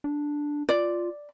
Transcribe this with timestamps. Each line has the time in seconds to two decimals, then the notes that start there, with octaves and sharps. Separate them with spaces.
0.04 D4
0.69 F4 D5